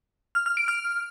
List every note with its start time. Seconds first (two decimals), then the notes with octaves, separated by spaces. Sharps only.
0.35 F6
0.46 F6
0.57 D7
0.68 F6